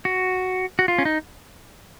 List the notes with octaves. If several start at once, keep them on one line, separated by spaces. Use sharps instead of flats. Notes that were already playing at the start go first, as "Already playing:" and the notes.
F#4
F#4
F4
C#4
D#4